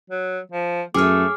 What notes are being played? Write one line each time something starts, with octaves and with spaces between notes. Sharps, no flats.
F#3
F3
F#2 A3 G#4 C#5 D6 F6